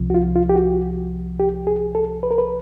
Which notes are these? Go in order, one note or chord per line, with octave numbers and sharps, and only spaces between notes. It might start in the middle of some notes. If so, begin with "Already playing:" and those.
Already playing: C2 C3 F3
F#4
F4
F4
G4
F#4
G4
G#4
A4
B4
A#4
B4